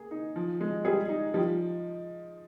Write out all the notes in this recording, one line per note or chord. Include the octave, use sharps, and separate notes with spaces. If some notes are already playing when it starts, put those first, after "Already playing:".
Already playing: A#3 G#4
D#4
F3
G#3
G3 G#4
D#4
F3 G3